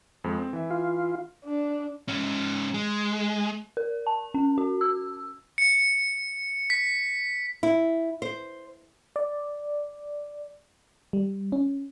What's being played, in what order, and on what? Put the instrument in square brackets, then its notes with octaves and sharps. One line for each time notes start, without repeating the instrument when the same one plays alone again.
[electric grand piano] F2 F3 G#3
C4
E3 E5
[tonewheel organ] F4
[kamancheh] D4
[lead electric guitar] G#2 C#4
G#3
[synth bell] A#4
A5
C#4
F#4
E6
[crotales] C#7
B6
[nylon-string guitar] E4
C5
[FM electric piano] D5
G3
C#4